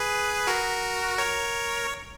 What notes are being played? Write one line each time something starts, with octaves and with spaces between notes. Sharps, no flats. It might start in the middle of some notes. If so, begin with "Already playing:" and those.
Already playing: G#4 B4
F#4 A#4
A#4 C#5